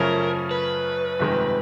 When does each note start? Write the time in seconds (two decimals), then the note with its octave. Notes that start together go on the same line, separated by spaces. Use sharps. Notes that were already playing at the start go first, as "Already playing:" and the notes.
Already playing: F#2 C#3 F3 A3 C#4 A#4
0.51 B4
1.19 G1 F2 C3 D#3 G#3